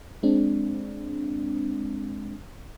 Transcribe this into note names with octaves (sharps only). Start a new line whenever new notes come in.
G#3 C4 D4